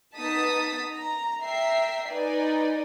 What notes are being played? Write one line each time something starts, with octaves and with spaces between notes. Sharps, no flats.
B3 D#4 A5 D#6 B6
A#5
E5 G5 A#5 C7
D#4 B4 D5 G#5